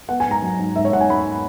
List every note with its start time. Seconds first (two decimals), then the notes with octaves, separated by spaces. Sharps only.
0.09 B3 F#5
0.20 G#5
0.25 G#2
0.31 A#5
0.42 F#3
0.59 G#2
0.76 G#2 E5
0.85 C#5
0.92 G#2 F#5
1.01 G#5
1.09 G#2 B5